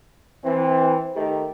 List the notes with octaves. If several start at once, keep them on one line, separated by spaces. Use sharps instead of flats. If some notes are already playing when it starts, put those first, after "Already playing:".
E3 C4
D#3 A3 G4